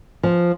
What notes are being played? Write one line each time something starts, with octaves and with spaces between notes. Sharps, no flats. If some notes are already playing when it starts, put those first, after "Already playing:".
F3